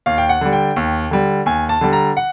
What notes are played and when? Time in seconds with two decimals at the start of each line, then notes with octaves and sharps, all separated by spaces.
0.06 D#2 F5
0.18 G5
0.29 F#5
0.41 D3 G3
0.53 G5
0.76 D#2
1.11 D3 G3
1.46 D#2 G#5
1.69 A5
1.81 D3 G3
1.93 A#5
2.17 F#5